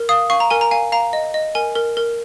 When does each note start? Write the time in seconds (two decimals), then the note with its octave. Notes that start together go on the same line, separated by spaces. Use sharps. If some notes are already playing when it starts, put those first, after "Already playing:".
Already playing: A#4
0.09 F5 D#6
0.30 F5 C#6
0.40 A#5
0.50 A#4 G#5
0.61 A#5
0.71 F5 G#5
0.92 F5 A#5
1.13 D#5
1.34 D#5
1.55 A#4 G#5
1.75 A#4
1.97 A#4